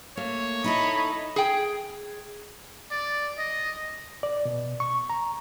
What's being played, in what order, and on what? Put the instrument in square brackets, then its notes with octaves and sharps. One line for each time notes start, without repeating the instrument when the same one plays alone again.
[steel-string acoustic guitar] A3 A#3 F5 [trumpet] C#5
[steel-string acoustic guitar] D#4 E4 A4 [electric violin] D#5 B5
[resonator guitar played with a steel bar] G#4 G5
[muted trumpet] D5
D#5
[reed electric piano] D5
B2
C#6
A#5